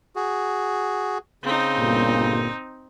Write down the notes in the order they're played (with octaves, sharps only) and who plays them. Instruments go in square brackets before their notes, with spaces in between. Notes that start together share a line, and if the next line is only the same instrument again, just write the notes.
[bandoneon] F#4 G#4
[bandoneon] C#3 [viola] C4 D#4
[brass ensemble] G1 A#2